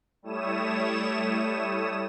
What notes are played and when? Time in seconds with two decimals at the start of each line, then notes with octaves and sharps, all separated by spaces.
0.22 G3 A3 E4 C#5 D#6 E7